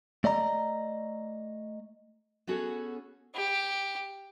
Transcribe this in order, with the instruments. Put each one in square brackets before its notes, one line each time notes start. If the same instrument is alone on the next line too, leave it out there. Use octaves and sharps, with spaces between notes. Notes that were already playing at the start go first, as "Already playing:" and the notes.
[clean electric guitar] A3 D5 D#5 A#5
[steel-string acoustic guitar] B3 C#4 F#4 G#4 A4 C#5
[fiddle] G4